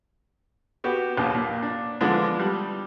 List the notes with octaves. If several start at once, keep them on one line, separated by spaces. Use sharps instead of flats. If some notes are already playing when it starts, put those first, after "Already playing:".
B3 F#4 G4
A#1 D#2
A#2
D4
D3 E3 F3 G#3 B3 D4
G3